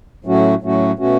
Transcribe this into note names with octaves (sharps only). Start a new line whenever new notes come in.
A2 F#3 A3 C#4 F#4
A2 F#3 A3 C#4 F#4
B2 A3 C#4 F#4